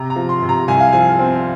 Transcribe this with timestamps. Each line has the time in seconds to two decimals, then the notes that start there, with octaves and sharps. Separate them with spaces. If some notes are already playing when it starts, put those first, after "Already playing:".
Already playing: C3 A#5
0.10 A#5
0.16 F3
0.29 C6
0.42 C3
0.49 A#5
0.68 C2 G#5
0.80 F5
0.92 F3 G#5
1.19 C4